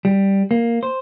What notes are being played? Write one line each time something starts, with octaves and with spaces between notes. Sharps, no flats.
G3
A#3
C5